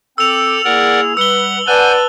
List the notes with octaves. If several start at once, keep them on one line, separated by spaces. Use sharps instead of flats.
C4 A4 G5 D6 E6 F7
A#3 E4 G#4 A#4 D5 F#5
G3 B4 F#5 E6 G7
B4 D5 F#5 G#5 A5 F#6 G6